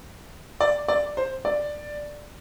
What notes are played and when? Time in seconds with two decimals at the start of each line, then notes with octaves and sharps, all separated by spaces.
0.60 D5
0.88 D5
1.17 C5
1.45 D5